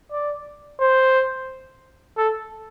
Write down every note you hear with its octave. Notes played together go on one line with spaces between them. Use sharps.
D5
C5
A4